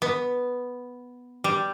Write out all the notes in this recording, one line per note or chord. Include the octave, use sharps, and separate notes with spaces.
B3
G3